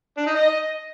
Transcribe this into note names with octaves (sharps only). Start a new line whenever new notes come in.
D4
D#4
D#5